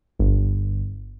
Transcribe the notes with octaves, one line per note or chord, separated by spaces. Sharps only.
G1